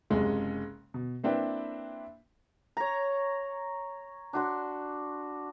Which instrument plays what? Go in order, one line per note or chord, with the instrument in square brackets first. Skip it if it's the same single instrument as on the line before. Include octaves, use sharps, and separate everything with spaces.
[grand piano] F#1 C3 G#3 C#4
B2
A#3 C4 D4 E4 B4 G5
[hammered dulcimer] C#5 A#5
D4 F#4 C6